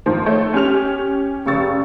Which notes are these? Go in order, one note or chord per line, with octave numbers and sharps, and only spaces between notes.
G#2 D#3 F3
A3 C#5
C#4 G4 F6 F7
F1 C#3 G4 C#6 E6 A6